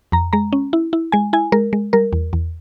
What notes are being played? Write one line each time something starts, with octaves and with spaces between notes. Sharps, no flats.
F2 A#5
G#3 A#5
C#4
E4
E4
G#3 G#5
E4 G#5
G#3 A#4
G#3
G3 A#4
E2
E2